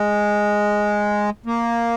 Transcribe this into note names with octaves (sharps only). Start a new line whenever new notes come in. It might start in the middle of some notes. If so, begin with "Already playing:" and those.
Already playing: G#3
A#3